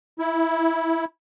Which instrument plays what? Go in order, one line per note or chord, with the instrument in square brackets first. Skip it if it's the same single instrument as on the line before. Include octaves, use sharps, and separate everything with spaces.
[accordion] E4